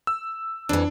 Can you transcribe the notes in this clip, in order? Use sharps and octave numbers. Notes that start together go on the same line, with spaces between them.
E6
F2 E3 D4